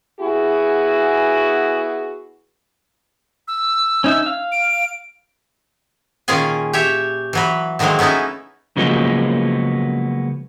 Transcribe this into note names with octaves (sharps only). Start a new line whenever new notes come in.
B3 E4 F#4 G#4
E6
C#4 D#4 E5
F5
D7
A#2 D#3 C#4 F4 G#4 G#5
G4 C#5 E5
E3 F#3 B4
D3 D#3 F3 F#3 G#3 A#3
A3 B3 C#4 D#4 E4
C#3 F3 F#3 G#3 A#3 B3